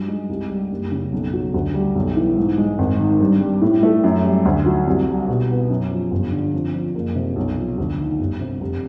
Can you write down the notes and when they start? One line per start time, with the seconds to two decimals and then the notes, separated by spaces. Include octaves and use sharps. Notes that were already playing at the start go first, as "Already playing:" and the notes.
Already playing: G2 F#3
0.08 G#3
0.29 C2
0.50 G3
0.71 F#1
0.92 C#3
1.12 B1
1.33 F#3
1.54 D2
1.74 G3
1.95 B1
2.16 E3
2.37 G#2
2.58 G#3
2.79 G#1
3.00 D#3
3.20 G2
3.41 G3
3.61 A2
3.83 A3
4.04 F#2
4.24 G3
4.45 D2
4.66 F#3
4.87 C2
5.07 G3
5.28 B2
5.49 B3
5.70 F#2
5.91 F3
6.11 G1
6.32 D3
6.54 F2
6.74 F3
6.95 F#1
7.16 C3
7.36 B1
7.57 F3
7.78 D2
7.99 D#3
8.19 G1
8.41 C3
8.61 F1